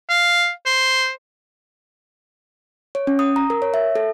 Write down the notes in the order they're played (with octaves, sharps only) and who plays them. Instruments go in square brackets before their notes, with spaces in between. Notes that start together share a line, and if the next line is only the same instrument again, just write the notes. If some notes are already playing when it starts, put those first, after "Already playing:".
[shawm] F5
C5
[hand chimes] C#5
C#4
D#6
A#5
A#4
C#5
E5
A4